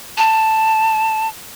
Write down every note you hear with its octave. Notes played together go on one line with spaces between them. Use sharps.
A5